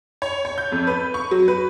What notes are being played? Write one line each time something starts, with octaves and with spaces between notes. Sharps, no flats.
C#5
C#5
G6
F2
B4
C#6
F#3
B4